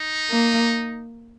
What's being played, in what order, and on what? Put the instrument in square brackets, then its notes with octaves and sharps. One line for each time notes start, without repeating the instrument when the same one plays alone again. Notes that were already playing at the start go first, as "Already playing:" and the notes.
Already playing: [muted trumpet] D#4
[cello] A#3